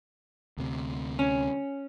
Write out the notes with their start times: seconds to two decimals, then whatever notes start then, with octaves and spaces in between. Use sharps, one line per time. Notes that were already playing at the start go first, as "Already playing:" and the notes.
0.57 D2 C3
1.19 C#4